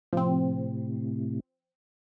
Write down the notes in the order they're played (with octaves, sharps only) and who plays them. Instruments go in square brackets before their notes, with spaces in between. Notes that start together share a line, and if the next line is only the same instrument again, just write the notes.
[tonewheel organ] A2 C3 [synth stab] F3 C4